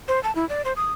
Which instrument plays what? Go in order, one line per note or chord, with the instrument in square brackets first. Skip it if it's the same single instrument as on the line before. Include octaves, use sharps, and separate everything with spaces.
[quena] C5
A5
E4
D5
C5
D#6